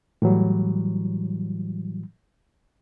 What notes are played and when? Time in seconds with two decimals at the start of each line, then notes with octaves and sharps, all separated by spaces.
0.22 A2 E3 F#3 G3